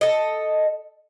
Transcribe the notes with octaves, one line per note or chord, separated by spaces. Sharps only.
A4 D#5